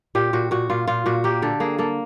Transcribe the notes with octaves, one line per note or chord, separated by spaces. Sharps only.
A#2 G4
A#2 F#4
A#2 F#4
A#2 F4
A#2 F4
A#2 F#4
A#3 G4
D3 A4
A#3 G#4
A#3 A4